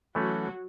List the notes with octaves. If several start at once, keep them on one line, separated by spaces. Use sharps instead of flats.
E3 F#3 A3 C#4 F#4